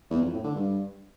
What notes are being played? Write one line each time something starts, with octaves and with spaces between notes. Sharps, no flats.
E2
F2
A2
D3
G2